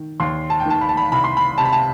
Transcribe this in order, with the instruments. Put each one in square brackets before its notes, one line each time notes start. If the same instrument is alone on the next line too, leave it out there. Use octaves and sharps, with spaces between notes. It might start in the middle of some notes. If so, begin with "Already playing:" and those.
Already playing: [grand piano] D#3
D#2 C6
A5
G5
D#3 A5
B5
A5
B5
C2 B5
C6
B5
C3 A5
B5
A5